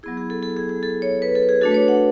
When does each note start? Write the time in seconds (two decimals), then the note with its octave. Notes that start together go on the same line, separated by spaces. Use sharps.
0.03 F#3 B3 E4 G#4
0.17 G#4
0.30 A4
0.42 A4
0.56 G#4
0.69 G#4
0.83 A4
1.02 C#5
1.22 B4
1.35 A4
1.49 G#4
1.61 A3 D4 F#4 A4
1.71 B4
1.74 C#5
1.88 F#5